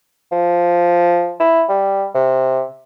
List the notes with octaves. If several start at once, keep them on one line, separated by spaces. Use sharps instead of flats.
F3
E4
G3
C3